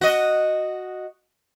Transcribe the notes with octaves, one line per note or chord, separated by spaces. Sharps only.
F#4 D#5